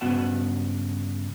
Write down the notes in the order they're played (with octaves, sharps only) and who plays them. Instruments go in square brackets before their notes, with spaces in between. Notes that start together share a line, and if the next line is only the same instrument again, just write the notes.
[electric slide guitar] G2 C#3 B3 F#4 F#5 A5